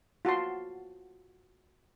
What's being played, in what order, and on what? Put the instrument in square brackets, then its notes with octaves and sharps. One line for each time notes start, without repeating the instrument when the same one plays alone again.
[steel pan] F4 F#4 A5 C6